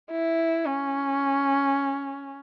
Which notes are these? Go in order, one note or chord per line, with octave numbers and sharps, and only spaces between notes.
E4
C#4